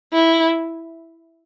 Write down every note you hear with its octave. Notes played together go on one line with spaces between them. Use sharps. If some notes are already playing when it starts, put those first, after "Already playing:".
E4